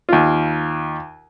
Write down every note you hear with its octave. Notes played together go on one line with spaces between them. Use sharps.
D#2 F4